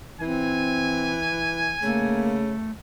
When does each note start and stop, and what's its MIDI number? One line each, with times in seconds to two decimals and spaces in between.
0.21 1.76 52
0.21 1.19 60
0.21 2.23 80
1.82 2.53 49
1.82 2.71 57
1.82 2.42 58